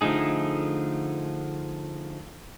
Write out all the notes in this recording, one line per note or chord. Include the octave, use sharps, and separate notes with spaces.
D3 F3 A3 D#4 G#4